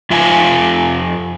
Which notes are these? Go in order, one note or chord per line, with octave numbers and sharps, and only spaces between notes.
F2 F4 E5 F5 G#5